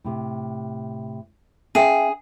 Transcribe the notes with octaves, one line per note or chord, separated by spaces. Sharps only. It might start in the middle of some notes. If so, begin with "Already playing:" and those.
A2 C3
C#4 G#4 E5 G5